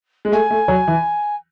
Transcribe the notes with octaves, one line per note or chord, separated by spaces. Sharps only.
G#3
A3 G#5
A3
F#3
E3